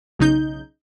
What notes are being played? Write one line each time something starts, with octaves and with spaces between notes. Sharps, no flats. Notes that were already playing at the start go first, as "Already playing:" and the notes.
B1 C#3 D#4 G6